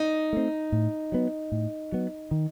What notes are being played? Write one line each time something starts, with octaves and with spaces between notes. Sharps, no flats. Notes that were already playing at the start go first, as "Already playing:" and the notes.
Already playing: D#4
A3 C4
A2
F#3 B3
A2
F#3 B3
D#3